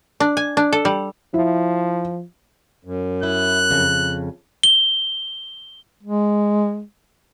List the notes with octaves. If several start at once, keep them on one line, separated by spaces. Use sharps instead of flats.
D4
G#5
D4
A4
G3
F3 E4
F#2
E4 F#6
F2 C#3
G7
G#3